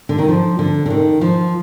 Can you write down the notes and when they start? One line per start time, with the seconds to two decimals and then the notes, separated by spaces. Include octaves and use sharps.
0.09 D3
0.18 D#3
0.29 F3
0.59 D3
0.86 D3
0.90 D#3
1.21 F3